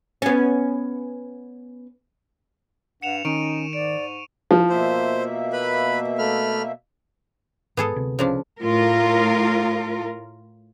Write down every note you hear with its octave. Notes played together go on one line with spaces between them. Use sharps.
B3 C#4
G2 F#5 C#7 E7 F7
D#3 C#4 D#4 C#6 D7 D#7
G#2 D5 D7
F3
B2 A#3 C5 E5
B4 B5
A3 B5 F6
G#2 B3 G#4 A4
D2 C3
C2 C#3 F3 D4
A2 F4 A#4